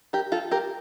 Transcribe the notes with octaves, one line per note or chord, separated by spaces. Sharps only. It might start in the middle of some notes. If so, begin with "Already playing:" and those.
G4 A#4
F4 A4
G4 A#4